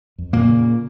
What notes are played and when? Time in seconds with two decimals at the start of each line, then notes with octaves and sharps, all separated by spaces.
0.18 F2
0.33 A#2 A#3
0.48 C#3